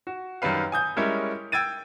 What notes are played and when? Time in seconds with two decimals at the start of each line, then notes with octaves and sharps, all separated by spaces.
0.07 F#4
0.42 F#2 D#3 G3 B4 F5
0.72 G#5 D#6 G6
0.96 G3 G#3 C#4 E4 A#4 C#5
1.52 G5 E6 G#6 A6 D#7